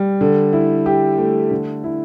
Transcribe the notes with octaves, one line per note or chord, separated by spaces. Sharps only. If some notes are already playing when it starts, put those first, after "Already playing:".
Already playing: G3
D3
E4
G4
A3
D3
E4